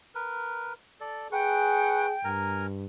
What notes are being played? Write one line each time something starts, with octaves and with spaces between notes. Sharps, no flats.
A#4 B4
A4 D5
G#4 B4 F#5 G5 C#6
G2 A#4 G#5 A#5